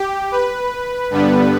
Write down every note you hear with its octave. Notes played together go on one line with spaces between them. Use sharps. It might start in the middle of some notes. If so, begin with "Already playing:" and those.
Already playing: G4
B4
G2 D3 G3 B3 D4